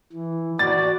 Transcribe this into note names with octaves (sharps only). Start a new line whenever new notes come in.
E3
F#4 D5 A6